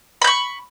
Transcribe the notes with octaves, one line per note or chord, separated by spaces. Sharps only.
B5 C#6 G6